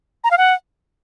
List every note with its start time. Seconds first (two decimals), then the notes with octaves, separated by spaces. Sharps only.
0.24 A#5
0.31 F5
0.38 F#5